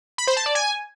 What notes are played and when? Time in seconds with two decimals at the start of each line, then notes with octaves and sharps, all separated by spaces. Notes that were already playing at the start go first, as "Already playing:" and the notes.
0.18 B5
0.27 C5
0.37 A5
0.46 D5
0.55 G#5